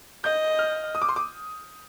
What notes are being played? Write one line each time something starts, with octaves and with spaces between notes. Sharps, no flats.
D#5 G6
F6
D#6
D6
C6
D6